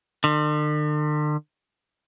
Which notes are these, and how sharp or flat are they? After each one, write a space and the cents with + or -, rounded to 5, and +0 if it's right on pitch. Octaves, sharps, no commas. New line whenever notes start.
D3 +45